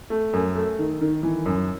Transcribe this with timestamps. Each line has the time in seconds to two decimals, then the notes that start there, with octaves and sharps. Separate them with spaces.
0.10 A3
0.33 F#2
0.56 A3
0.79 D#3
1.01 D#3
1.23 E3
1.46 F#2